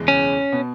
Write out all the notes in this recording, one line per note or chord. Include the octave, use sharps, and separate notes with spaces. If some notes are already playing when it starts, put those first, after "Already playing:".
Already playing: F#1 E2 B2 G#3
C#4
B2 B3